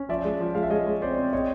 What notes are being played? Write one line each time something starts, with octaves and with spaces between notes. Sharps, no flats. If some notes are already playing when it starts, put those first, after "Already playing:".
Already playing: C#4
F3 D5 E5
G#3
F3
G#3 F5
E5
G#3 C#5 D#5
G#3
C4 C5 D5
C4
C4 C#5 D#5